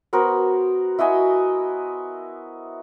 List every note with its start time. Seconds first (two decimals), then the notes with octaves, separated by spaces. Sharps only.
0.13 B3 F#4 A#4 C5
0.99 E4 F#4 D#5 G#5